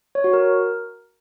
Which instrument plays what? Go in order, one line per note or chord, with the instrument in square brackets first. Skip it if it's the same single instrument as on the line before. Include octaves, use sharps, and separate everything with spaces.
[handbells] C#5
F#4
A#4